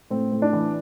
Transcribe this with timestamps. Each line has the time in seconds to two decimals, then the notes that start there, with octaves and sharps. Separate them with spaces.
0.10 A2 C4
0.32 A2
0.42 D4
0.53 E3